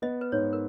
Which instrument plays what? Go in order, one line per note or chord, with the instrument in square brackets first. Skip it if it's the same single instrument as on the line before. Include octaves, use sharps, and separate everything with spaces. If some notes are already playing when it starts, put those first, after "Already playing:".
[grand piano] B3 [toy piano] D#5
[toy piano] B4
[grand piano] G#2 [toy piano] C#5
[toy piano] A#4